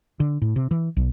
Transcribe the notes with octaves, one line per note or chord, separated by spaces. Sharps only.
D3
A2
C3
E3
B1